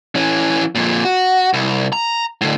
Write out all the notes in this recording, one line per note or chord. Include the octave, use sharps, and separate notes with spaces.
E3 C#4
F2 A#2
F#4
C2
A#5
A2 D3